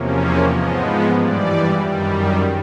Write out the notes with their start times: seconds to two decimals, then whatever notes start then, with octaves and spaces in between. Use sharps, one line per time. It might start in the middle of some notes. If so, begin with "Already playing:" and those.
Already playing: E2 C3 F3 A#3 C#4
0.19 C#5
0.51 G#2 F3 G#3 B3 D#5
1.17 G2 E3 G3 D5
1.83 F#2 D#3 G3